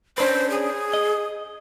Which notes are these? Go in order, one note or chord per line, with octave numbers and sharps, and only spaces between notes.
C#4 D4 B4 C5
G#4
D#5